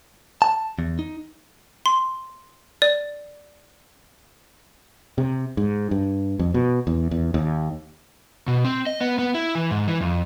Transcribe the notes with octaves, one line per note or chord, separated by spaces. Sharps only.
A5
E2
D#4
C6
D5
C3
G#2
G2
F2
B2
E2
E2
D#2
B2
C4
D#5
B3
B3
E4
E3
G#2
E3
F2